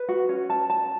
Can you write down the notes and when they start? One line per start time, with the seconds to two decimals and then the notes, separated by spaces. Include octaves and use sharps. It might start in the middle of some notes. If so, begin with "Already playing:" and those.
Already playing: B4
0.09 F#4
0.29 C#4
0.50 A5
0.70 A5